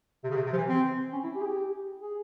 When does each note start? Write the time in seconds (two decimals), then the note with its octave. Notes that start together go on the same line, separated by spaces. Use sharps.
0.24 C3
0.30 C#3
0.36 C3
0.46 C3
0.52 F3
0.57 E3
0.68 C4
1.13 C#4
1.24 E4
1.35 G4
1.41 G#4
1.45 G4
2.01 G#4